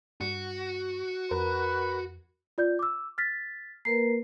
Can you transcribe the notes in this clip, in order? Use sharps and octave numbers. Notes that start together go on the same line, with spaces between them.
G2 F#4
F2 A#4 B4
F4 D5 G6
D6 E6
F6 A6 B6
A#3 A#4 B4 C7